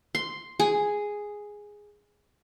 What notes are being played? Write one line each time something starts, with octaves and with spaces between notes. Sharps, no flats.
C6
G#4